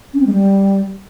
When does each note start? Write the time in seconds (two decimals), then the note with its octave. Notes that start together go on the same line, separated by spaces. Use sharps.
0.14 C#4
0.20 C4
0.26 G#3
0.33 G3